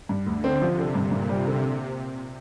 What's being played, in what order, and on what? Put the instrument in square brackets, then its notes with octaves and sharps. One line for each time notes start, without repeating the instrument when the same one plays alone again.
[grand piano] G2
[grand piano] D2 [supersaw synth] D3
[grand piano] C4
[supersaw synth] C3 [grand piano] F3
[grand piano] D3
[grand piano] G2 [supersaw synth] A#2
[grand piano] G2
[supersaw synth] C3 [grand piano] G3
[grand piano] D3